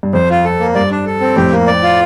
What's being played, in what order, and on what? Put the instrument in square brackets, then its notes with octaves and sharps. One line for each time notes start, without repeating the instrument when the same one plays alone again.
[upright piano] G2
[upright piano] F2 [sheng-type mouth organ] C5
[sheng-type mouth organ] F4
A4
A#3
[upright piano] G2 [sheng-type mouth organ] D5
[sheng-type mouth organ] D4
A4
C4
[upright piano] F2 A2 [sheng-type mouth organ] G4
[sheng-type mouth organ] A#3
D5
F4